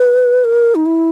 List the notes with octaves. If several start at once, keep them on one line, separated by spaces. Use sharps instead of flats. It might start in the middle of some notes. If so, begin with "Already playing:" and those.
Already playing: B4
A#4
D#4
E4